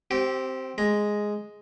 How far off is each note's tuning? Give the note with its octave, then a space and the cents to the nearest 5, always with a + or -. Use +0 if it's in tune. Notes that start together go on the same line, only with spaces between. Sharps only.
C4 +0 G4 -25
G#3 +0 A#5 +10